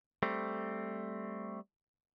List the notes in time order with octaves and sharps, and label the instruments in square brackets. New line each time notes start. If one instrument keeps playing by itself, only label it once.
[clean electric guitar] G3 A3 C4